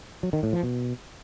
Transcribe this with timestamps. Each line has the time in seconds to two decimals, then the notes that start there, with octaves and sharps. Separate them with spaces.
0.23 F#3
0.33 D#3
0.43 A2
0.53 F3
0.63 B2